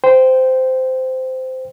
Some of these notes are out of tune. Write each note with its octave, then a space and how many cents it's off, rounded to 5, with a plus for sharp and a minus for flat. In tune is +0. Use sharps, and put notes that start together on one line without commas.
C5 -15 G5 +0